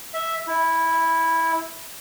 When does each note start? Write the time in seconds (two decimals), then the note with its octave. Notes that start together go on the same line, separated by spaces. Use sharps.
0.14 E5
0.47 E4